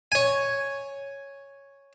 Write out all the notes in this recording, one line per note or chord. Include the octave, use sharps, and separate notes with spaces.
C#5 G#5